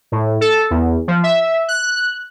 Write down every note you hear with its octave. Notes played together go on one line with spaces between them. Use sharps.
A2
A4
E2
F3
E5
F#6